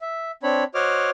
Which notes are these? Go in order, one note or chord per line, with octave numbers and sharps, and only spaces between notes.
E5
C4 D4 C#5 B5
F#4 C5 C#5 D#5 D6 F6